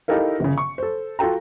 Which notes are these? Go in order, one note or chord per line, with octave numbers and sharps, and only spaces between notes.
D#4 E4 G4 A4 A#4 F5
G1 C#3
C#6
A4 C5
F4 F#4 A4 G5 A#5